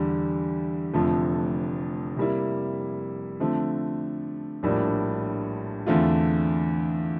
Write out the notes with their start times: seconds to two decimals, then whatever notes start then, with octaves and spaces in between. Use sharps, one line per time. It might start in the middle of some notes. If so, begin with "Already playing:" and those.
Already playing: E2 D3 G3
0.94 F1 F2 D3 F3 A3
2.17 C3 G3 A#3 E4
3.40 D3 F3 A3 C4
4.63 A#1 A2 G3 A#3 D4
5.87 E2 D3 A3 C4 F4